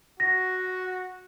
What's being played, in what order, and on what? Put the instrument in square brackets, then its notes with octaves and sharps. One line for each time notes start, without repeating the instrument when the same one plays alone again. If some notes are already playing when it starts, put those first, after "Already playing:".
[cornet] F#4 [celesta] A#6